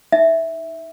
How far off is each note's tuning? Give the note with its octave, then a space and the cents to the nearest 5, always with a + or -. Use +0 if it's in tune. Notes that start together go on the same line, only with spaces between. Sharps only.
D#4 +0 E5 -5